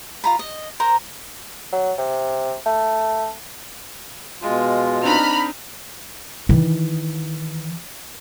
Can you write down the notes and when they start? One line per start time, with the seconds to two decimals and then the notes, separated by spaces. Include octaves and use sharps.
0.24 F4 A#5 B5
0.39 D#5
0.80 A#4 C5 A#5
1.72 F#3
1.98 C3
2.66 A3
4.42 B2 G#3 F4
5.03 C4 D4 D#4 A#5 B5 F6
6.49 D#3 E3